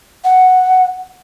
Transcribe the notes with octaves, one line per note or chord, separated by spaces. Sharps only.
F#5